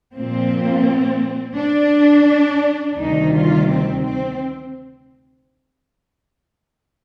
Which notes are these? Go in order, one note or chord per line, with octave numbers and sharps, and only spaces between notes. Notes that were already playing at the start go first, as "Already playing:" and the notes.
A#2 F3 A#3 C4
D4
D2 C3 D#3 G3 D#4
F4
C4
C4